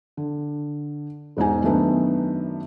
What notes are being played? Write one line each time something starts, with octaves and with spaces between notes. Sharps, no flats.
D3
E1 G#2 D#4 G#5
F#2 D#3 A3 B3 D4